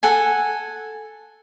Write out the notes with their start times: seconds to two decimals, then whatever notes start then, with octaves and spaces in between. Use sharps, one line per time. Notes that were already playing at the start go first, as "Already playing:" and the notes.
0.03 A4 F#5 G#5